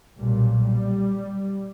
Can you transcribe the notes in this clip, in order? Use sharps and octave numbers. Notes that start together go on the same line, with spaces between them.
B1 A#2 G3
G3